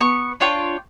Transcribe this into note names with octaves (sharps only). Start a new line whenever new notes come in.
B3 C#6
D4 F4 C#5 G5